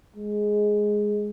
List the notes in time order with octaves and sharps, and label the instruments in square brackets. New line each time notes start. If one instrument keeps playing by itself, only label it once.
[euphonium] G#3